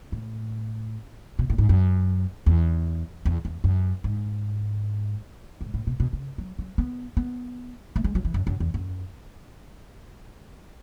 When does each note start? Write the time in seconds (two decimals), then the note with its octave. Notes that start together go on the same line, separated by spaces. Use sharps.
0.12 A2
1.39 B2
1.50 A2
1.58 G#2
1.69 F#2
2.46 E2
3.25 E2
3.45 E2
3.64 F#2
4.04 G#2
5.61 G#2
5.74 A2
5.87 B2
6.00 B2
6.13 C#3
6.38 F#3
6.59 F#3
6.78 B3
7.17 B3
7.96 A3
8.04 G#3
8.15 F#3
8.25 E3
8.34 F#2
8.47 F#2
8.60 E2
8.74 F#2